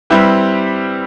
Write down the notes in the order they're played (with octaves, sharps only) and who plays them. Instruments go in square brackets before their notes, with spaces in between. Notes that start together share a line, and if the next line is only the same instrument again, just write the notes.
[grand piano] G3 C4 E4 G4 B4